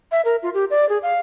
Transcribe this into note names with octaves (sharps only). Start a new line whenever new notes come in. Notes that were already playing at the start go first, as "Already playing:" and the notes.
E5
A#4
F4
G4
D5
G#4
F5